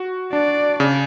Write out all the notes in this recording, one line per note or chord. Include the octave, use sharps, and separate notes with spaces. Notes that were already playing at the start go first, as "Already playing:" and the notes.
Already playing: F#4
D4 D5
C#3